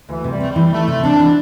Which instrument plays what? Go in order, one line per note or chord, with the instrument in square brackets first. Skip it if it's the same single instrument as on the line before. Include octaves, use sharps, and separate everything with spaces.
[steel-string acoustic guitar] D2 [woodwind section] E3
[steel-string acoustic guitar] C3
[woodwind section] G3
[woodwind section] A3 [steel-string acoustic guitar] C4
[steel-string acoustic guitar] E3 [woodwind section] G3
[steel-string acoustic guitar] D2 [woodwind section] A3
[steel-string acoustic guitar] C3
[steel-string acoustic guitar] C4 [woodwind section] D4
[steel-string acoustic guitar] E3